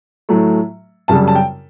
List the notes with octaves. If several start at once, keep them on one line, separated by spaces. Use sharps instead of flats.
A2 F#3 A3
F#2 C#3 G3 A5
A5
G5